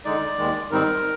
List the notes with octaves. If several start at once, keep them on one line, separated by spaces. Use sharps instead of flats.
D3 G#3 D#4 D5
D#2 D#3 G#3
G#2 D#3 G3 C4 D#4 A#4